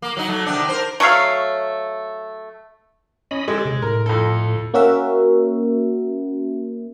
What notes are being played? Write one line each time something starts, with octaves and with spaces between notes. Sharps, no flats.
A#3
F#3 D#4
F#3 A3
C3 D#3 D4
A#4 C5
F#3 A3 C#5 F5
C#4 D#5 B5
G#3 G4 A4
C3
A2 A#4
F2 A4
A#3 C#4 F#4 A#4 E5